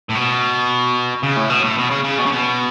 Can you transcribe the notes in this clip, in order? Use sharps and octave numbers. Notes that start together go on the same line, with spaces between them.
A2
B2
C#3
A2
B2
A2
B2
C#3
C#3
B2
C#3
B2